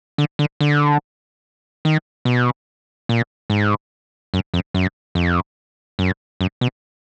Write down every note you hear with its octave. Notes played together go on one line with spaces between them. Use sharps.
D3
D3
D3
D#3
B2
A#2
G#2
F#2
F2
F#2
F2
F#2
F#2
B2